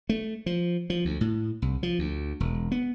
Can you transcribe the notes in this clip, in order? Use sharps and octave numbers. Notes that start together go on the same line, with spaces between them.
A3
F3
F3
D2
A2
C2
F3
D2
E1
B3